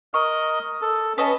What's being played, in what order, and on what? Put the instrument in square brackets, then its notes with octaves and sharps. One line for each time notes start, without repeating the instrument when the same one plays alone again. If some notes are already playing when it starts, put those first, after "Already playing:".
[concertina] A#4 D#5 [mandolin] C#6
[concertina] A4
[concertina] C#4 [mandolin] B4 D#5 A5